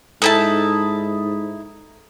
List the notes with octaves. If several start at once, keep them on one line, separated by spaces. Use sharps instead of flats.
G#2 D#4 E4 A4 A5